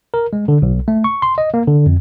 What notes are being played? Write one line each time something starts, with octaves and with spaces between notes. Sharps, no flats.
A#4
G#3
D3
B1
A3
C#6
C6
D#5
A#3
D3
F2